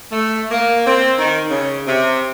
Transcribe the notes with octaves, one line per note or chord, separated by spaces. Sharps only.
A3
A#3
C4
D#3
C#3
C3